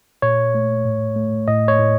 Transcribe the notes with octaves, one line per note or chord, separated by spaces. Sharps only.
A#2 C#5
A3
A2
A3
A2 D#5
C#5
A2